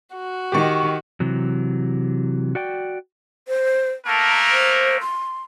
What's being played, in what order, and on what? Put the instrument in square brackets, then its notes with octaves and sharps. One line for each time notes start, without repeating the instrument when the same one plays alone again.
[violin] F#4
[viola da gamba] D#3 [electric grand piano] G4 C#6
[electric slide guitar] C3 E3 F#3
F#4 D5 G5
[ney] C5
[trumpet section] A3 A#3 A#4 [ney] A5
[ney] C5
C6